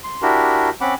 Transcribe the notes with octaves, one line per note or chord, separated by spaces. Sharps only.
C6
D4 E4 F#4 G4 A#4
C4 C#4 F#5 B5 D6